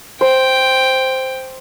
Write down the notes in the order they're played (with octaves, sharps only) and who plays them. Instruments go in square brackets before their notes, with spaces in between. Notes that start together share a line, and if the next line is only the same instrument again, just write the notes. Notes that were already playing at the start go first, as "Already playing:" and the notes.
[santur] C5 [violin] G5